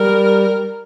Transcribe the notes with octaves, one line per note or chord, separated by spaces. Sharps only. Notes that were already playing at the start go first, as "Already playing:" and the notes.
Already playing: G3 A#4